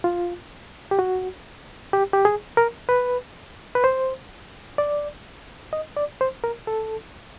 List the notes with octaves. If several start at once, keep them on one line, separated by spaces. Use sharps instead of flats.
F4
G4
F#4
G4
G4
G#4
A#4
B4
B4
C5
D5
D#5
D5
C5
A#4
A4